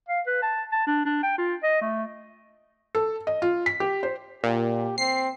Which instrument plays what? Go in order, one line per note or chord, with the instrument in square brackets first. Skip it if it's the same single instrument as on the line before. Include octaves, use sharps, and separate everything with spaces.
[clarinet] F5
B4
A5
A5
D4
D4
G5
F4
D#5
A3
[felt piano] A4
D#5
F4
B6
G4
C5
[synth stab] A#2 [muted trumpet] G4
[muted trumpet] C4 [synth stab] C7